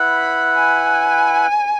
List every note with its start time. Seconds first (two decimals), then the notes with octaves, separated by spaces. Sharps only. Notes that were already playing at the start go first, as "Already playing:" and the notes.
Already playing: E4 B4 F#5
0.16 B5
0.55 G#5